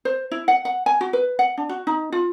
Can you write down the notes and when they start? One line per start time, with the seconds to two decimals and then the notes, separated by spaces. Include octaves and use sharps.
0.05 C5
0.31 E4
0.48 F#5
0.65 F#5
0.86 G#5
1.01 F#4
1.13 B4
1.39 F#5
1.58 D4
1.69 F#4
1.87 D#4
2.12 F4